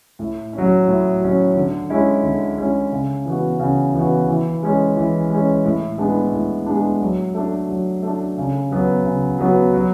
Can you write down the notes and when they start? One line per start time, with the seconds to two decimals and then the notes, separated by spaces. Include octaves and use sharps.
0.19 A2
0.53 C#4
0.58 F#3
0.88 A2
1.21 F#3 C#4
1.56 D3
1.90 G#3 C#4 E4
2.23 D3
2.58 G#3 C#4 E4
2.92 C#3
3.25 E3 B3 F#4
3.60 C#3
3.94 E3 B3 F#4
4.28 E3
4.63 G#3 C#4
4.97 E3
5.30 G#3 C#4
5.65 A2
5.98 G#3 B3 D4
6.32 A2
6.66 G#3 B3 D4
7.00 F#3
7.34 A3 D4
7.69 F#3
8.02 A3
8.07 D4
8.37 C#3
8.71 F#3 B3 F#4
9.05 C#3
9.38 F#3 B3 F#4
9.73 F#3